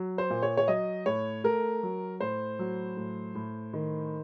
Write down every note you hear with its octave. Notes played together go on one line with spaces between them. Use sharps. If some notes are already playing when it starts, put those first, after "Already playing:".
Already playing: F#3
C5
A#2
C#5
C#5
F#3 D#5
A2 C#5
A3 A#4
F#3
A2 C5
F#3
A2
A2
D#3